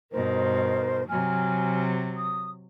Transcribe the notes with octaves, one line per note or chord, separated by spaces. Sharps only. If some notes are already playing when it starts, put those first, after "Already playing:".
G2 B2 D#4 A#4 C5
C3 F#3 G#5 F6
D#6